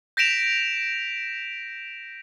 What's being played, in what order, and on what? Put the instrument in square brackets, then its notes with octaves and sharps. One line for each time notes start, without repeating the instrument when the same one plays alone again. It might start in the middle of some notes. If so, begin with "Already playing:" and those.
[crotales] G6 A#6 B6 D7 E7 F7